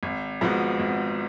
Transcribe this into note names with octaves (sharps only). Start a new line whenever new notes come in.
G#1
G#2 F3 B3 F#4
G#1